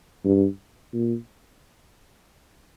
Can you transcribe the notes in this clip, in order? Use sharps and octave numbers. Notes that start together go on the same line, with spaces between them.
G2
A#2